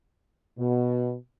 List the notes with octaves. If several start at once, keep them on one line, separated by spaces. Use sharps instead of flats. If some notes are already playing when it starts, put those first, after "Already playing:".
B2